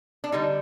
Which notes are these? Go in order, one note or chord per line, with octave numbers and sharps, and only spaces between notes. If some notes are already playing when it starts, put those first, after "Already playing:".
D4
D3 G3 D#4